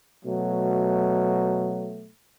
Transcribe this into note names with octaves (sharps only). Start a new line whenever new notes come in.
B2 F#3 A3